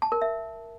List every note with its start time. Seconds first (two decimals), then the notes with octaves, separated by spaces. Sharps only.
0.02 A5
0.12 A#4
0.22 E5